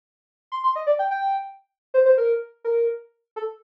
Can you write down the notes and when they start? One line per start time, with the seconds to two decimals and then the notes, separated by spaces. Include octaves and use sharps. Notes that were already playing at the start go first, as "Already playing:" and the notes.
0.52 C6
0.64 C6
0.76 D#5
0.87 D5
0.99 G5
1.11 G5
1.94 C5
2.05 C5
2.18 A#4
2.64 A#4
3.36 A4